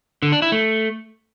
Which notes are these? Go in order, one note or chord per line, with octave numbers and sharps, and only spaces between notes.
D3
D4
E4
A3